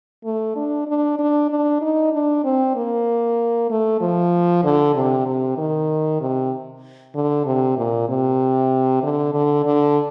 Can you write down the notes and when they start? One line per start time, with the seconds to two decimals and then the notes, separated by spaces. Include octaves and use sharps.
0.25 A3
0.56 D4
0.87 D4
1.19 D4
1.50 D4
1.82 D#4
2.13 D4
2.44 C4
2.76 A#3
3.70 A3
4.01 F3
4.64 D3
4.95 C3
5.27 C3
5.58 D#3
6.21 C3
7.15 D3
7.45 C3
7.77 A#2
8.09 C3
9.03 D3
9.34 D3
9.65 D3